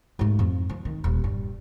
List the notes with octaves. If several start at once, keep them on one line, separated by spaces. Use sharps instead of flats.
G#2 A3
F2
F3
D#3
D#1
G2